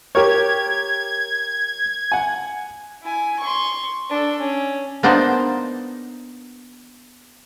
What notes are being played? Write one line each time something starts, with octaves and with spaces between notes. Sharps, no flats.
G4 A#4 C#5 G#6
F#5 G#5
E4 G#5
C6 C#6
D4 A4
C#4
A#3 B3 D4 D#4 C5